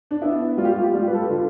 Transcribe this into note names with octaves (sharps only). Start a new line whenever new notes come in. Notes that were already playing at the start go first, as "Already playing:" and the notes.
D4
B3 E4
G3 F4
G4
F4
G4
G3 F4
B4
A4
G4
D3 F4